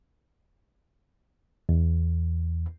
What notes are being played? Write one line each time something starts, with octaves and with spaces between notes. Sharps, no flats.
E2